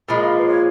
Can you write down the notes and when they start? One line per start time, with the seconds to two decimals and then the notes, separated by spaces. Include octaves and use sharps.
0.09 A#2 F3 G#3 B5
0.19 D#5
0.27 F5
0.37 B4
0.45 C#5